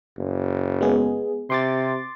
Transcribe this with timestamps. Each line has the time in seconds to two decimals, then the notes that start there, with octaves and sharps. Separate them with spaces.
0.18 F#1
0.81 G#3 B3 G#4
1.50 C3 C6 D6 A6